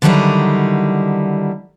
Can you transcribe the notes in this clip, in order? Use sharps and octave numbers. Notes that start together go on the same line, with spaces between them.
D3 D#3 F#3 G3 D#4 E4